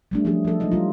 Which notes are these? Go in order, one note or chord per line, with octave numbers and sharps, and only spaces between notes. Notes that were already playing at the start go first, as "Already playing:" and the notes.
G3 A3 D4
F3 F#3 A3 C#4 D4 G#4
F3 A4
F#3 G#3 D#4 D#5
G3 F4